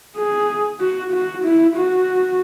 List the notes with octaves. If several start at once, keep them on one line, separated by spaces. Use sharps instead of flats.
G#4
F#4
F#4
E4
F#4